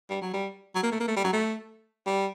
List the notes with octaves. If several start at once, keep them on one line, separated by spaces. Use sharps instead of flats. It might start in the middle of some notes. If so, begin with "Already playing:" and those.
G3
F#3
G3
F#3
A#3
A3
A#3
A3
G3
F#3
A3
G3